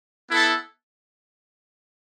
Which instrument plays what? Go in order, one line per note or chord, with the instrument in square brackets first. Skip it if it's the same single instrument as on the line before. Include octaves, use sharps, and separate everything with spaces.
[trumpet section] B3 E4 A4 E5